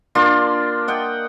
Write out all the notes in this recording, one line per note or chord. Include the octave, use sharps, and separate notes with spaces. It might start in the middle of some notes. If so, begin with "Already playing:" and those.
A#3 D4 F4 C6
D#5 F#5 G5